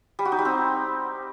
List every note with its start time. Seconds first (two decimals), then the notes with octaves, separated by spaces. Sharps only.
0.19 G3
0.25 F#4
0.32 D#4
0.39 G3
0.45 C4